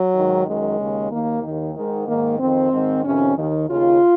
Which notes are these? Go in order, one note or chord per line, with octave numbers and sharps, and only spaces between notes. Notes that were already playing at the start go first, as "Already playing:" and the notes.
Already playing: F#3
G#2 D#3
F#2 D#3 G#3
D#2 C#3
D#2 D#3 A#3
D#2 D#3
G#2 D#3
G#2 D#3 A#3
F2 D#3 C4
G#2 D#3
F2 C3 D#3 C#4
D#2 D#3
D#2 C#3 F4